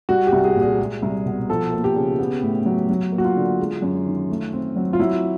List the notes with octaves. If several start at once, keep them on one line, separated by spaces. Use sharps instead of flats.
G3 F#4
G4
C2
G#4
A#2
G#4
G#3
C2
B2
F3 A4
A#3
G4
C#3
B3
A2
F#3
F#3
A#3
F#4
F4
D3
G#3
F#2
D#3
A3
C4
F#3
F4
F#3 E4